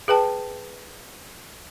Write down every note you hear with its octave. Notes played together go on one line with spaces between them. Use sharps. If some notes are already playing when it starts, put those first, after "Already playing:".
G#4 B4 G5 A5